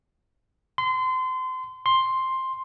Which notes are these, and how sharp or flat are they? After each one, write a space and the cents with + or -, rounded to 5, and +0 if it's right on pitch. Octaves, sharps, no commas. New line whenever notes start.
C6 -30
C6 +5